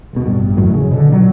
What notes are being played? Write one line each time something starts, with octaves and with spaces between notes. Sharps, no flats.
E1 B2
A1 G2
A1 F#2 A2 F#3
C#3
B2 D3
A#2 F#3 G3